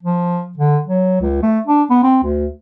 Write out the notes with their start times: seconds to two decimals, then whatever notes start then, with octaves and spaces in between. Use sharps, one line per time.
0.03 F3
0.57 D3
0.87 F#3
1.21 C#2
1.42 A3
1.66 D4
1.90 B3
2.03 C4
2.23 D2